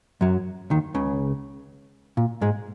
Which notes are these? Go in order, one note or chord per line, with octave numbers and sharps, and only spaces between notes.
F#2 F#3
D#2 D#3
C#2 C#3
A#2
G#2 G#3